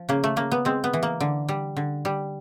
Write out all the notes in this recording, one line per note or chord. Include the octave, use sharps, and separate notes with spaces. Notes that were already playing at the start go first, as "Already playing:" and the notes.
Already playing: F3
C#3 A#3
A3
C#3 A#3
B3
G#3 C4
B3
E3
A#3
D3
G3
D3
G3